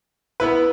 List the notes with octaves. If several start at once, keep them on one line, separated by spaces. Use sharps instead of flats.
B3 E4 B4